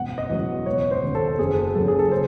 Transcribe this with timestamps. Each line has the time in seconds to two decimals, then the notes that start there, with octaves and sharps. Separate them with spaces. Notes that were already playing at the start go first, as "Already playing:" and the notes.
Already playing: E1 F#5
0.18 D#5
0.30 E2 C#3 F#3
0.66 E1 C#5
0.91 C5
1.03 D#2 C#3
1.15 A4
1.39 F#1 G#4
1.75 F#2 C#3 A4
1.88 G#4
1.99 A4
2.11 C5